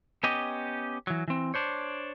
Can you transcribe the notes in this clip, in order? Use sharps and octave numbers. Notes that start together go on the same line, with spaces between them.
B3 C#4 G4 D#5
E3 F#3
E3 C4
D4 C5 C#5